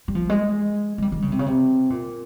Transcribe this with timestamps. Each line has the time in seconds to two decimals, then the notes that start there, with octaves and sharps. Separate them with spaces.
0.08 G3
0.15 F3
0.29 G#3
0.98 G#3
1.02 G3
1.12 D#3
1.22 C#3
1.32 C3
1.39 C#3
1.46 C3
1.90 A#2